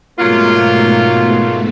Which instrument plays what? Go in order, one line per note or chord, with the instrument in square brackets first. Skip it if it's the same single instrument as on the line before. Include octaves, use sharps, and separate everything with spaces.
[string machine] G#2 B2 A3 [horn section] F#3 A#3 F4